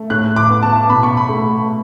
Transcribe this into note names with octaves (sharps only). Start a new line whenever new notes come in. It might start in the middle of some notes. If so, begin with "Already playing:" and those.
Already playing: A3
A2 F#6
D6
B3
A5
B2 B5
C#6
B5
A3